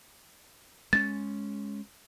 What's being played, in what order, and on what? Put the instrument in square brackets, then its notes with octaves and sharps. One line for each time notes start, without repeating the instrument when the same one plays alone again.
[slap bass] G#3 C#4 [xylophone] A6